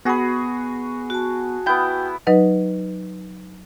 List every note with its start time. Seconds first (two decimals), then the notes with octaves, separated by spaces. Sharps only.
0.05 B3 F#4 G#4 B5
1.10 F#4 A5
1.66 B3 E4 G5 G6
2.27 F#3 D#4 B4 D#5 F#5